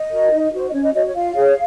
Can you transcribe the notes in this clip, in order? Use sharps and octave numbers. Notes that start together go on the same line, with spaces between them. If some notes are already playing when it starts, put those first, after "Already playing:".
Already playing: D#5
F#4 A#4
D#4
F#4 C5
D#5
C#4 C#5
D#5
F#4 C#5 D#5
C#5
F4 F5
G#4 C#5